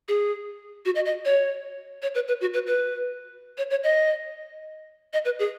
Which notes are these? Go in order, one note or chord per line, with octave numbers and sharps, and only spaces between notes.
G#4
F#4
D#5
D#5
C#5
C#5
B4
B4
F#4
B4
B4
C#5
C#5
D#5
D#5
B4
G#4